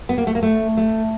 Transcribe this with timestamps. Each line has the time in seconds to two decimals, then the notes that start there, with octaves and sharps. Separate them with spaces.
0.09 B3
0.18 A#3
0.27 A3
0.35 A#3
0.43 A3
0.77 A3